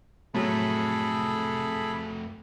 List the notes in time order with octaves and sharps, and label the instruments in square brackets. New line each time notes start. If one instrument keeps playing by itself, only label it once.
[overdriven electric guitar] F2 A3 [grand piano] A2 F#3 [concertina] G#4 A4 B5